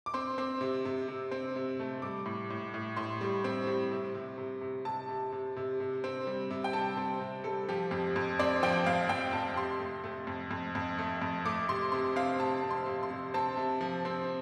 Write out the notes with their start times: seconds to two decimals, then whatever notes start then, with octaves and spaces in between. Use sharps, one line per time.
0.06 D6
0.14 C4 C6
0.38 C4
0.61 C3
0.85 C3
1.08 C3
1.31 C4
1.56 C3
1.79 A3
2.02 G3 D6
2.26 A2
2.50 A2
2.74 A2
2.96 A2 C6
3.21 G3
3.44 C4
3.67 G3
3.91 C3
4.14 C3
4.38 C3
4.61 C3
4.85 C3 A5
5.09 C3
5.32 C3
5.57 C3
5.80 C3
6.04 C4
6.27 G3
6.50 C3
6.64 G5
6.73 G3 A5
6.97 C4
7.20 C3
7.44 G3 A4
7.68 F3 G4
7.91 F2 G4
8.16 F2
8.39 C4 D5
8.63 F3 G5
8.86 F2 F5
9.09 F2 G5
9.33 F2 A5
9.56 C3 C6
9.80 A3
10.04 A3
10.27 F2
10.51 F2
10.75 F2
10.98 A3
11.22 F2
11.46 A3 D6
11.69 C3 C6
11.92 C3 C6
12.16 C4 F5
12.40 C3 A5
12.63 C4
12.70 C6
12.86 C3
13.03 C6
13.10 C3
13.34 C4 A5
13.57 C3
13.81 F3
14.05 C4